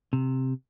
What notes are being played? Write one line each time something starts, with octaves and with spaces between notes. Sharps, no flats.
C3